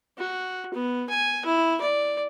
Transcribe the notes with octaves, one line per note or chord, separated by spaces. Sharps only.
F#4
B3
G#5
E4
D5